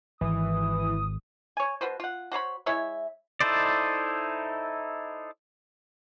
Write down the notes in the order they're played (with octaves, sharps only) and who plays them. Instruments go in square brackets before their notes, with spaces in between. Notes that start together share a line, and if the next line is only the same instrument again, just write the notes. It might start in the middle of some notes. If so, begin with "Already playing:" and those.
[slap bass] G#1 [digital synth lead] E3 [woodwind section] D#6
[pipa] C#5 G#5
B2 F#4 B4 C5
F4 F#5
F#4 C5 C#5 B5
G#3 E4 C#5 E5
[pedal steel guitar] D#4 E4 A4 C5 D5